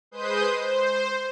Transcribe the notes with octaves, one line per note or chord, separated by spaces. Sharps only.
G#3 B4 C5 C6 D#6 G6
C5